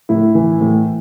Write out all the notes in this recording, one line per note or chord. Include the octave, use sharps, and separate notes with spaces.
A2 E4
E3
A2